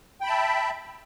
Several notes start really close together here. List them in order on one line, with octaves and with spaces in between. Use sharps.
G5 B5 A5 E5